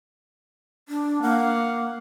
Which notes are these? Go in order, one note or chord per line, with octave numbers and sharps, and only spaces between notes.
D4
A#3 F5 F#5